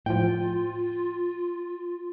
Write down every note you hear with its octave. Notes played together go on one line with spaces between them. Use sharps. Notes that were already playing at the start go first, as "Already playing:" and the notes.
A2 F3 F4 G5